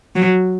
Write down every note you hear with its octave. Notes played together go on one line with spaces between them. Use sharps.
F#3